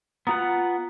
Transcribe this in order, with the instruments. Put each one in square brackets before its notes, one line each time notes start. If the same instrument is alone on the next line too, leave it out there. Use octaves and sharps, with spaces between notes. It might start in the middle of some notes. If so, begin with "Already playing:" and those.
[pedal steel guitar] B3 F4 F#5 [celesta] A#5 D#6